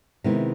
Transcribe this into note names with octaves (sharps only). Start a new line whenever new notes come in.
C3 D#3 G#3 B3 E4